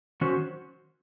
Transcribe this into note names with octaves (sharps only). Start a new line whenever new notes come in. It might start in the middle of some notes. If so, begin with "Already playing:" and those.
D#3 F#3 C#4 F#4 C5